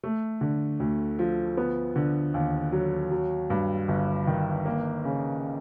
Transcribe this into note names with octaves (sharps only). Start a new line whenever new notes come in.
A3
D3
D2
F3
B3
D3
D#2
F#3
F#3
G2
G1
D#3
A#3
C#3